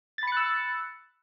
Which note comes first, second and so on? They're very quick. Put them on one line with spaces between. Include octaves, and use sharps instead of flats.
A6 B5 C#7 F#6 E6